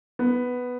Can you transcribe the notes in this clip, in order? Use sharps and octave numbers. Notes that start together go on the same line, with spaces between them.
B3